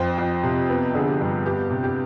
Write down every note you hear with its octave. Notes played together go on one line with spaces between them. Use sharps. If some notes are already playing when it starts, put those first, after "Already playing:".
Already playing: F2 C5
F2
C3
B3
D3 G#4
G4
G2
B3 G4
C3
G4